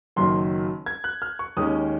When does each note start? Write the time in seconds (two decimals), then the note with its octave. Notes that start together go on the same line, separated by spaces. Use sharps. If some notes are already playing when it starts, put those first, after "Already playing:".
0.16 F#1 F#2 D#3 F#3 C6
0.86 G#6
1.04 F#6
1.22 F6
1.39 C#6
1.57 D#2 D#3 G#3 C#4 D#6